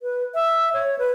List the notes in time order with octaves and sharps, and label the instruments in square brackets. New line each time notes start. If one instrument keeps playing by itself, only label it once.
[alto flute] B4
E5
C#5
B4